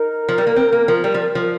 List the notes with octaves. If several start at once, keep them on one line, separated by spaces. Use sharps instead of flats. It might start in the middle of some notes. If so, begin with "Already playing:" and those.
Already playing: D#4 A#4
F3
G3
A#3
C4
A#3
F3
G3
F3
F3